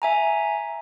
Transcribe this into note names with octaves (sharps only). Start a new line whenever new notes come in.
E5 G#5 A#5